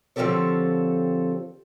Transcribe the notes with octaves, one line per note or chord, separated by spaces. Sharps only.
D3 F3 C4 G4 A4 C#5